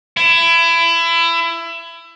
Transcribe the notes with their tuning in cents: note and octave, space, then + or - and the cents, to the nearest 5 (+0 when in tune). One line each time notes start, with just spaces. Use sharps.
E4 +25